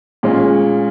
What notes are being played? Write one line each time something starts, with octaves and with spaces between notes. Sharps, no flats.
A#2 G#3 C#4 F4